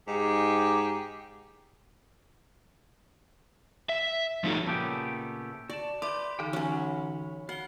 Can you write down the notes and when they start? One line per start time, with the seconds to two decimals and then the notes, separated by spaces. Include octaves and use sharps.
0.07 G#2 D#4 G4
3.89 E5
4.44 F3 A3 C#4 D#4 F#4 A4
4.66 A#2 C#3 A3 B3 G4
5.70 F#4 D5 A5
6.02 B4 D5 E5 C6 D6
6.39 D3 E3 D#4 G5
6.53 F#3 C#4 C#5 B5
7.49 F#4 F5 F#5 G7